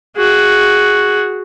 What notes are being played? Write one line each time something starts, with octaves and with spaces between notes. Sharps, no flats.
F#4 G#4